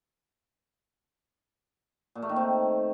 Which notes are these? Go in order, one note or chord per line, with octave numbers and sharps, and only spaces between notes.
A#2
A3
D#3
C4